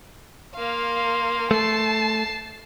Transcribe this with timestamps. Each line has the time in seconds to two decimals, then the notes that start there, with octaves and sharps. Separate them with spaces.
0.55 A#3 F5 C6
1.51 A3 A5 C7